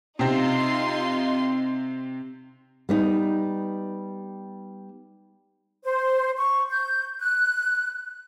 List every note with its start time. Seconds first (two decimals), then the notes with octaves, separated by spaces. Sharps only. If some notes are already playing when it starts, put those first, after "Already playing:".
0.19 C3 C4 D#4 F4 C6
2.89 G3 B3 D#4
5.84 C5
6.38 C#6
6.70 G6
7.19 F#6